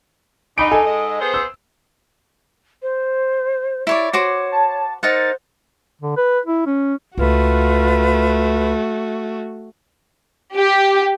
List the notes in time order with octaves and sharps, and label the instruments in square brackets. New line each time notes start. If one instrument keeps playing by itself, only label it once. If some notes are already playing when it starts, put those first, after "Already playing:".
[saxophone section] G#2 D3 D#4 [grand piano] B5 D7
[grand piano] A4 G#5
[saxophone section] G#2 G#3 D#5
B3 G#4 C5
[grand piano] E6
[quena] C5
[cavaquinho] E4 C#5 D5
[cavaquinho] F#4 C5 D6 [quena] C#5
[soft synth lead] A5
[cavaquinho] D#4 A#4 F#5 [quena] C5 [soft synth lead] A6
[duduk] D3
B4
E4
C#4
[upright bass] C#2 [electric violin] A3 F#4 [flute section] F4 B4
[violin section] G4